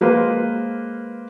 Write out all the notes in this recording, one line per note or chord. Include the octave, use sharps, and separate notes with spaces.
G#3 A#3 B4 C5 F5